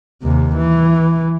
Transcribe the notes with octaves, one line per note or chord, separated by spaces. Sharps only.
D#2 C3
E3